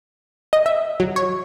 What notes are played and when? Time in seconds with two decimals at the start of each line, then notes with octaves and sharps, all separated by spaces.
0.53 D#5
0.66 E5
1.00 F#3
1.16 C#5